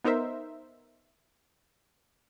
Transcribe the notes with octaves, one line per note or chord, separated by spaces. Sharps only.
B3 D#4 A#4 C5 E5